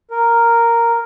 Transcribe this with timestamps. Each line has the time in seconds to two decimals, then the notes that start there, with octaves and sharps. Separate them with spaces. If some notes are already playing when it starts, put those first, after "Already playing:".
0.11 A#4